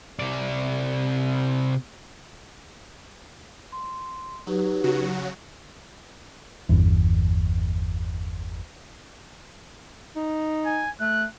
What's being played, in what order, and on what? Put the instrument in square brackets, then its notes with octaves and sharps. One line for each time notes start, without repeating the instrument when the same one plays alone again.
[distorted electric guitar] C3 D5
[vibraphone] C6
[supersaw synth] F#3 [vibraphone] D#4 G4 B4
[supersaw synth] C#3 F#3 F#4
[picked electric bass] G1 E2
[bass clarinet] D#4
[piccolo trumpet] G#5
[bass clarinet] A3 [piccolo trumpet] F#6